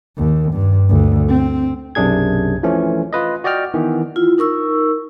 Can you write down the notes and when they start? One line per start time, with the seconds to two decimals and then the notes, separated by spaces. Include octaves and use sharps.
0.17 D#2
0.53 G2
0.89 D2
1.29 C4
1.95 B1 F#2 C3 D4 G#4 G#6
2.63 E3 F3 A3 C#4
3.13 F4 B4 D#5
3.44 F#4 D5 D#5 G5 F6
3.74 D#3 E3 B3
4.16 E4 F4
4.38 D#4 A#4 C#6 E6